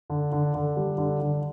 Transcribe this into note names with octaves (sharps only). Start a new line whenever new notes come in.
D3
D3
D3
G3
D3
D3